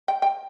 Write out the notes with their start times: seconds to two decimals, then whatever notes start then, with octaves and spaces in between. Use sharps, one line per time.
0.08 G5
0.22 G5